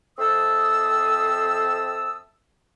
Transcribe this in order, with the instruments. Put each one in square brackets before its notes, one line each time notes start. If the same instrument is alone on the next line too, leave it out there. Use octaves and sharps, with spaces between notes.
[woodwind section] F2 C4 E5 A5 D#6 E6